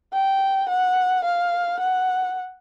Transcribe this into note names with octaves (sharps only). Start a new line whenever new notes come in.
G5
F#5
F5
F#5